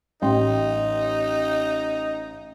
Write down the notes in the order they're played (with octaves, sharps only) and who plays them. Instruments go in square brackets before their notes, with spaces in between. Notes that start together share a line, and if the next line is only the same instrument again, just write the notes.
[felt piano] A1 G5 C6 [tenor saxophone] D#4